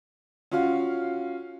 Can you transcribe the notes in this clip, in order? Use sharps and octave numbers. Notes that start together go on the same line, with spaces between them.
C#4 F4 F#4 F5